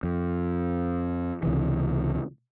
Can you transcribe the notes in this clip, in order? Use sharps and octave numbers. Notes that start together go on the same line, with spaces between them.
F2
C#2 C3 E3